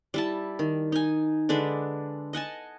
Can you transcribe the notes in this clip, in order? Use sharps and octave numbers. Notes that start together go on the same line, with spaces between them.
G3 E4 A5
D#3
D#4 G#5
D3 G#3 D4 B4
D#5 F#5 G#5 A5